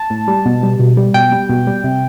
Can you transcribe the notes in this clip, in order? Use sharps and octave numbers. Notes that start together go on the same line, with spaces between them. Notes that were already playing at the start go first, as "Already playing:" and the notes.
Already playing: A5
A2
G3
B2
G3
B2
G3
B2 G5
G3
B2
G3
C3